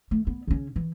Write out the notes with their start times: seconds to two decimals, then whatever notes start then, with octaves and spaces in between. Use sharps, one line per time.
0.11 A3
0.27 B3
0.47 C#3 C#4
0.76 E3